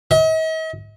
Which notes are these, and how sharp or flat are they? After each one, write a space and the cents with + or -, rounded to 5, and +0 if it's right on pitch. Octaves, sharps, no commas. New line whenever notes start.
D#5 +45